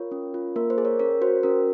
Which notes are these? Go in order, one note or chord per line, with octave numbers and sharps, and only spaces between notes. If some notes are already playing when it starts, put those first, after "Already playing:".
Already playing: F4 A#4 C#5
C#4
F4
A#3 A#4
C5
G#4
A#4 C#5
C#4 A#4 C#5
F#4 C5
C#4 A#4